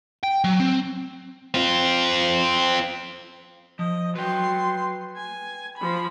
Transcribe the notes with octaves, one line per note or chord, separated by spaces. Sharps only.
G5
F#3
C4
C4 F4
F3 D#5
F#3 B4 G5 C6
G#5
F3 B5